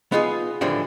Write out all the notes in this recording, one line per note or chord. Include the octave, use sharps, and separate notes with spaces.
B3 D#4 F4 G#4
A2 D3 E3 F3 G3 D4